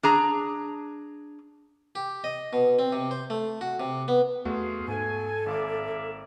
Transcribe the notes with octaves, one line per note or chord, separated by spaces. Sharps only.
D4 G#4 A#5
G4
D#5
B2
C4
C3
C5
A3
F#4
C3
B3
E2 A3 B3 F#4 G#4 F5 C6
G#2 A4 G#5
G#1 A#3 D5 E5 F5 D6